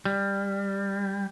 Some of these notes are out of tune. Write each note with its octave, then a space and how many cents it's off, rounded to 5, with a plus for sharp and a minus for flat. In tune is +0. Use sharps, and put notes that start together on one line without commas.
G3 +15